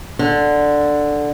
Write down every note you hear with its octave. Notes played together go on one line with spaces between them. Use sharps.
D3